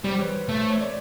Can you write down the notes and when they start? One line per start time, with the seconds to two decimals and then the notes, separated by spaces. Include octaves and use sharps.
0.04 G3 C5
0.18 B4 C#5
0.49 A3
0.58 C5
0.70 C#5
0.80 D5